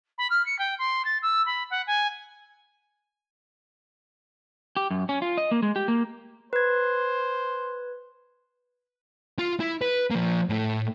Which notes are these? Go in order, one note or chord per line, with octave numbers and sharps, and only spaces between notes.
B5
F6
C#7
G5
C6
A6
E6
B5
F#5
G#5
G4
F#2
C#4
F4
D#5
A#3
G#3
G4
A#3
B4 C5 G#6
F4
E4
B4
F3 A#3
A2 A3